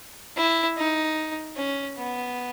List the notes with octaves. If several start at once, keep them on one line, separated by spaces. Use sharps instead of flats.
E4
D#4
C#4
B3